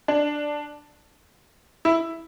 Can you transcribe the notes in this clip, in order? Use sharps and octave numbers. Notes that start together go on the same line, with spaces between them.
D4
E4